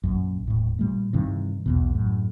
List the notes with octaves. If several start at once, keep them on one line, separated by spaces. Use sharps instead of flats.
A#1 F#2
D#1 A2
A#2 G3 A3
G2 C3 D#3 E3
B1 E2 B2
F#2 A2